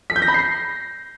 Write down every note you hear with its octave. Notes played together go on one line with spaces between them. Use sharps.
B6
G6
A#6
B5
C7